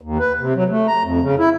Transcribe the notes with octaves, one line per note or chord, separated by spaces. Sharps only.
D#2
B4
C3
F#3
A3
A#5
F2
C#3
E4